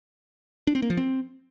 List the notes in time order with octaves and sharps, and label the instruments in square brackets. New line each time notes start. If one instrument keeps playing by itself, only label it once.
[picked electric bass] D4
C4
A#3
F3
C4